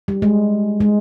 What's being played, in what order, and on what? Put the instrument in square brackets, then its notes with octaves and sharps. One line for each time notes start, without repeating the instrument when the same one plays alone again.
[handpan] G3
G#3
G#3